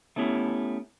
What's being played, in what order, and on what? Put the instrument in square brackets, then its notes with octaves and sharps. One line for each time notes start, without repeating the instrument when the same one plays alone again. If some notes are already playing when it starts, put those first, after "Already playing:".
[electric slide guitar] A3 B3 C#4 E4 G4